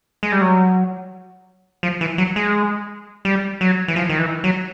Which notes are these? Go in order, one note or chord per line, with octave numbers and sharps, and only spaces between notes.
G#3
G3
F#3
F3
E3
F#3
G#3
G3
F#3
E3
F3
D#3
E3
F#3